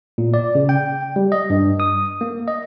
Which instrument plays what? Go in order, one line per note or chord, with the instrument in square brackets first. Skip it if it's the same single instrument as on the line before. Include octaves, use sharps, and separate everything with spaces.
[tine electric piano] A#2
D5
C#3
G5
G3
D#5
G2
D#6
A#3
D#5